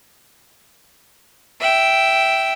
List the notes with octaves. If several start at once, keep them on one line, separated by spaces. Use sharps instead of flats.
E5 G5